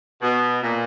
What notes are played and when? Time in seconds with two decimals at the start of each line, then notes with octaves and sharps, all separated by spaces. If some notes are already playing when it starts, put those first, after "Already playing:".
0.22 B2
0.63 A#2